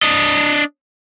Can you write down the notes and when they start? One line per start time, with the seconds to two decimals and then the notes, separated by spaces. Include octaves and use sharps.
0.03 D4 D#5